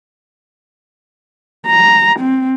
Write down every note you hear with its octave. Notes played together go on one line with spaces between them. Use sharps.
A#5
C4